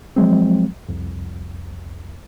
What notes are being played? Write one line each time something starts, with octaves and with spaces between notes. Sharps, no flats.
F3 F#3 G#3 C4
C2 F2